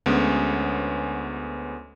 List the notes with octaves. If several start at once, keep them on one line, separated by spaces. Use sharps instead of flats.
D2 G#3 B3 C#4 C#5